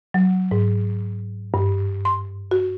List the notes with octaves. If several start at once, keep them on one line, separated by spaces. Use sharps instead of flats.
F#3
G#2
G2
C6
F#4